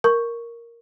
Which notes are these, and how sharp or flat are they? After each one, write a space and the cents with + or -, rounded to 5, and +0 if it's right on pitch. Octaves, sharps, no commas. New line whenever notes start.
A#4 +0 C#6 +0